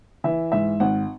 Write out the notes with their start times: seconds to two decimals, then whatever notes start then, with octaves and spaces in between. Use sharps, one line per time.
0.24 E3 E5
0.52 G#2 E5
0.80 G#1 F#5